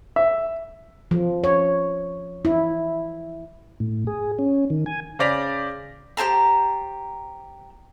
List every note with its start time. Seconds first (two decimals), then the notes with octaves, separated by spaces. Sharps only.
0.16 E5
1.11 F3
1.44 C#5
2.45 E4
3.80 A2
4.07 G#4
4.39 C#4
4.70 D#3
4.86 G#5
5.19 C#3 C5 D5 A#6 B6 F7
6.17 G4 C5 A5 A#5